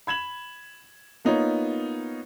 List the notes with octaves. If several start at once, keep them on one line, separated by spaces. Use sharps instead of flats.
B5 G#6 E7 F#7
A#3 B3 D#4 F4 C#5